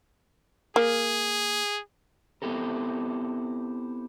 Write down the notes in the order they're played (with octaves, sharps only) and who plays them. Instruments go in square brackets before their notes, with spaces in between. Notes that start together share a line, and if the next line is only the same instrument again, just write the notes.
[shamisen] A#3 [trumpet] G#4
[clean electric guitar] B3 C4 E4 G4 A4 A#4